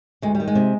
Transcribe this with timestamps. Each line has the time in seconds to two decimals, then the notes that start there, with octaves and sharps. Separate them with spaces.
0.22 D2 G#3
0.35 G3
0.40 D#3
0.47 G#3
0.55 C3